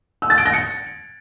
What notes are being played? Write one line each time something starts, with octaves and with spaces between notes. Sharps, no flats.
E6
A6
D7
A#6
C#7